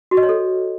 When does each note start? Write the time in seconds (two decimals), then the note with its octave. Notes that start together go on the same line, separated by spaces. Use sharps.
0.11 F#4
0.17 D#5
0.23 C#5
0.29 A4